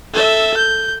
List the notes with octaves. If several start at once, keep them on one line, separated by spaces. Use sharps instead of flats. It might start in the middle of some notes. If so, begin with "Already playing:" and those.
A4 E5
G6